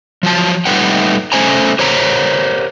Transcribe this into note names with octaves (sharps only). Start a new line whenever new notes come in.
F3 F#3 A5
G3 A3 D#4 B4 F#5 G5
A3 C#4 C5 G#5 A#5
G4 A#4 C5 C#5 F#5 A#5